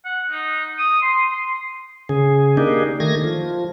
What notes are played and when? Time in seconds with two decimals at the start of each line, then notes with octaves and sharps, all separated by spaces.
0.05 F#5
0.31 D#4
0.79 D#6
1.02 C6
1.32 C6
2.09 C#3 G#4
2.57 A#3 D4 D#4 G4 G#4
3.00 D#3 A3 G#6 A#6
3.24 F3